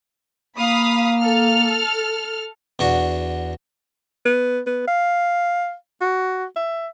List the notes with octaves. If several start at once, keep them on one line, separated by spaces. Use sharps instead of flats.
A#3 F5 B5 D#6
A4 F6
E2 D4 F#4
B3
B3
F5
F#4
E5